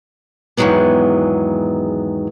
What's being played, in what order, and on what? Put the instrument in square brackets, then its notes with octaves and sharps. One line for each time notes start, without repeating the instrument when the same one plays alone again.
[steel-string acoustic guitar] E2 G#2 D#3 F#3 G#3 B3